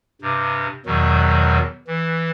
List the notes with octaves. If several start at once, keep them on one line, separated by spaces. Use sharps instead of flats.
G2 C3
E2 B2 D#3 F#3
E3